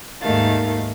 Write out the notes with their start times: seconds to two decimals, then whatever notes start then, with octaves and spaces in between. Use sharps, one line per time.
0.21 D#2 G#2 D#3 A3 F5